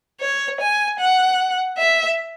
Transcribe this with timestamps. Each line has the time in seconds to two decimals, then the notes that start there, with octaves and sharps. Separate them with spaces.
0.21 C#5
0.60 G#5
0.99 F#5
1.78 E5